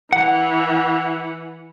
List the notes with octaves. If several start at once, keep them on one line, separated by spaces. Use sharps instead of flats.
E3 F#5